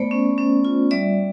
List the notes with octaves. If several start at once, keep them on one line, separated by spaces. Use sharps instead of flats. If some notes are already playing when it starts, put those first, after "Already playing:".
Already playing: A3 B3 C5 D5
C#4
C#4
F4
G3 D5 E5